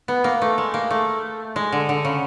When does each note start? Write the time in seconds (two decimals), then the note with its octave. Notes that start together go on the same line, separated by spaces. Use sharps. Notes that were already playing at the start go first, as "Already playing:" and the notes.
0.08 B3
0.24 A#3
0.42 A3
0.58 G#3
0.74 A#3
0.91 A3
1.56 G#3
1.72 D3
1.89 D3
2.05 C#3